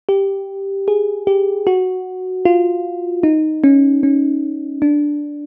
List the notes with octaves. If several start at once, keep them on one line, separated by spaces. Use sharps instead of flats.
G4
G#4
G4
F#4
F4
D#4
C#4
C#4
D4